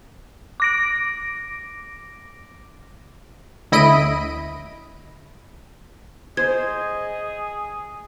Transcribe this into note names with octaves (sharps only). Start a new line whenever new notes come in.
D6 A#6 D7
D2 E4 D#5 B5 D7 D#7
G#4 C5 D#5 G#6